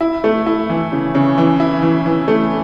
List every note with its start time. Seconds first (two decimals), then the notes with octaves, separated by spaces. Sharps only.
0.01 E4
0.24 A3
0.46 E4
0.69 E3
0.92 C#3
1.15 C#3
1.38 E3
1.60 E4
1.82 E3
2.06 E3
2.28 A3